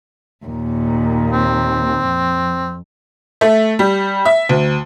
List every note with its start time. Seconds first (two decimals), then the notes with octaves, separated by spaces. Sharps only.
0.46 D#2 A#2
1.33 C4
2.04 F2
3.41 A3
3.79 G3
4.25 E5
4.49 D2